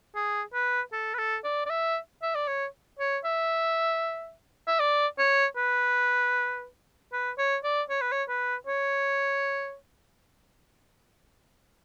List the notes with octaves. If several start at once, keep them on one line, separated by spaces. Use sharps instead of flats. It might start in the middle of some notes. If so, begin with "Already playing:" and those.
G#4
B4
A4
B4
A4
D5
D5
E5
E5
D5
C#5
C#5
E5
E5
D5
C#5
B4
B4
C#5
D5
C#5
B4
C#5
B4
C#5